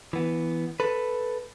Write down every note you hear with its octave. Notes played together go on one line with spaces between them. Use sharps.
E3 B3
A4 B4